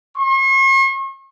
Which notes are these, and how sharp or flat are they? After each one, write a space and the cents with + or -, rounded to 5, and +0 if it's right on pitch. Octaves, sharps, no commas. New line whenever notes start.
C#6 -45